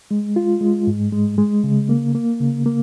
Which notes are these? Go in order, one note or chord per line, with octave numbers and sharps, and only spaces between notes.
G#3
F4
G#3
G#2
G#3
G#3
C#3
A#3
A#3
C#3
A#3